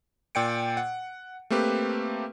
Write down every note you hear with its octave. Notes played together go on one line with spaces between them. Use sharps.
A#2 D5 G5 C#7 D7
F#5
A3 A#3 C4 G4 B4